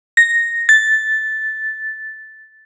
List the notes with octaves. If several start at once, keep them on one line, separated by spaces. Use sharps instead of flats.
A#6
A6